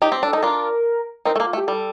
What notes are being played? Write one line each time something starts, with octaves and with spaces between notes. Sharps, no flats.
D#4 G4
C4
D4 A4
D#4 A4
D4 F4 A#4
C4 D#4 A#4
A3 A4
A#3
F4
A3
G4
G3 A4